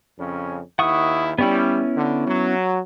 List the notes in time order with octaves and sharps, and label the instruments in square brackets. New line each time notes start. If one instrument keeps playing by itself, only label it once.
[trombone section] F2 C#3 C#4
[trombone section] D#2 D#3 E4 [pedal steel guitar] F#5 C#6 D#6
[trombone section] G3 [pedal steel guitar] B3 C#4 E4
[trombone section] D3
F#3